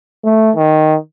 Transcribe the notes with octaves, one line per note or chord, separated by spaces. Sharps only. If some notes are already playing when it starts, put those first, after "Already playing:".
A3
D#3